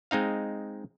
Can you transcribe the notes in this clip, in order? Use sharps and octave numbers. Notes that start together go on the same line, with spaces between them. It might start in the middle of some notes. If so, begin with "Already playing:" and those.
G#3 C4 D#4 F5